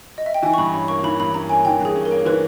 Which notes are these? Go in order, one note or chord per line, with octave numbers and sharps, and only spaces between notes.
D#5
E5
G5
E3 G#5
C#6
G2 B5
C#4 B5
A#3 C#6
E3 B5
G2 B5
C#4 A#5
A#3 G#5
E3 G5
G2 G#4
C#4
A#4
A#3
E3 B4